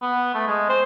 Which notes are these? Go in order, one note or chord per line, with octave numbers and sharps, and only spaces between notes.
B3
A3
G#3
C5